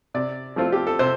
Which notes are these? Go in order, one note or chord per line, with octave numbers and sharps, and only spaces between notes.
C3 D5
F3 A3 C4 F4
G4
A4
C3 C5